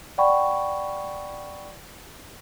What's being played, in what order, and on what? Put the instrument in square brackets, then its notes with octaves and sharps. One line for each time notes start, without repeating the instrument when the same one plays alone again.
[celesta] D5 F#5 G5 B5 C#6